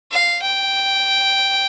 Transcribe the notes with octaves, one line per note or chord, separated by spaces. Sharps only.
F5
G5